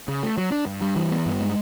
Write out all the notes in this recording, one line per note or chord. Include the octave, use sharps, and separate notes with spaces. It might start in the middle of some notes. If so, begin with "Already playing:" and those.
C#3
A3
F#3
D4
G2
G3
E3
B3
G2
G#3